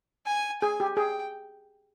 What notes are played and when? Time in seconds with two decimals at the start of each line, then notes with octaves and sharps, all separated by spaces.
0.26 G#5
0.62 G#4 G#5
0.80 G4
0.97 G#4 G5